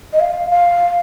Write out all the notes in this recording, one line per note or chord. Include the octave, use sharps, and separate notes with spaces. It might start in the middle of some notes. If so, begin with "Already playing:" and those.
D#5
F5
F5